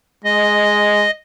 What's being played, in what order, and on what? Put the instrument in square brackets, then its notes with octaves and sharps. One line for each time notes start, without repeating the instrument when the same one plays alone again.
[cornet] G#3 [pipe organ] D#5